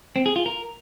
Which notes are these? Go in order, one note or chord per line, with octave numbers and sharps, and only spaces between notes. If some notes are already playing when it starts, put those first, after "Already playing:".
C4
G#4
F4
A#4